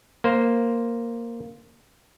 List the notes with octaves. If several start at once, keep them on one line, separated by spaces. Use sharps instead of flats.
A#3 C5